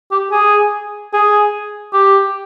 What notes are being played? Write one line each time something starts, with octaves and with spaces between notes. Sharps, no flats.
G4
G#4
G#4
G4